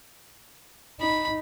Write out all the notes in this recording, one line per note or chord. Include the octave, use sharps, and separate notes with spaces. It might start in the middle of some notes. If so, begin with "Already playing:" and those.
D#4 B5